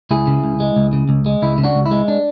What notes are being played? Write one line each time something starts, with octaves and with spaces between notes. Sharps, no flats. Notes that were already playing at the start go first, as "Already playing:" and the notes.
C#2 E4 G#4
C#3
C#2
G#3
C#2
C#3
C#2
G#3
C#2 E4
C#3
D4 F#4
C#2
E4
G#3
D4